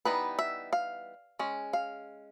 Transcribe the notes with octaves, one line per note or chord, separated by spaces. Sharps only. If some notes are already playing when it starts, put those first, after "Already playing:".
E3 G3 B3 D#4 B4
E5
F5
G#3 C#4
F5